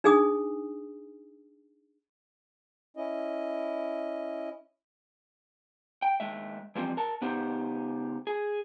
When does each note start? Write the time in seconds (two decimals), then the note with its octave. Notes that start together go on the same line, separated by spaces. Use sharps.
0.04 D4 D#4 G#4 G#5 D#6
2.97 C#4 E4 D#5
6.02 G5
6.20 D#2 G#3 E5
6.75 E3 F3 G3 C4
6.97 A#4 A5
7.21 C#3 B3 D#4 G4 C5
8.27 G#4